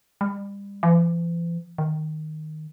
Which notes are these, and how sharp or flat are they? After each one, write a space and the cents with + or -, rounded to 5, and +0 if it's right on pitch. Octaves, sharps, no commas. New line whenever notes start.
G3 +35
E3 +45
D#3 -5